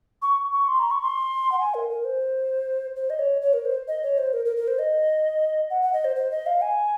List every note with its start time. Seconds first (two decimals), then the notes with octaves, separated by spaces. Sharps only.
0.22 C#6
0.53 C#6
0.68 C6
0.80 A#5
0.91 C#6
1.02 C6
1.52 F#5
1.60 G#5
1.74 A#4
1.90 A#4
2.05 C5
2.96 C5
3.10 D#5
3.19 C#5
3.42 C#5
3.53 A#4
3.65 C5
3.88 D#5
4.03 C#5
4.18 C5
4.33 A#4
4.45 A#4
4.57 A#4
4.68 C5
4.79 D#5
5.70 F#5
5.82 F#5
5.93 D#5
6.05 C5
6.16 C5
6.31 D#5
6.46 F5
6.62 G#5